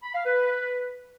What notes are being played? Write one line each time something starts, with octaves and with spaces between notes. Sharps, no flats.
B5
F5
B4